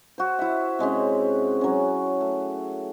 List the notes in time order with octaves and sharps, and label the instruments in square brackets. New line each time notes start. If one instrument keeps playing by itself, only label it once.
[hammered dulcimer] F#4 C5
E4 E5
C3 G#3 C4 C#4
F#3 C#4
A3